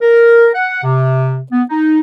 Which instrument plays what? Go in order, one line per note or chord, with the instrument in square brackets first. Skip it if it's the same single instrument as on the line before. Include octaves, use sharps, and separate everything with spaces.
[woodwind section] A#4
F#5
C3
B3
D#4